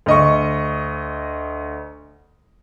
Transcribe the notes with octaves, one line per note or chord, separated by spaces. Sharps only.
D2 D#5 C#6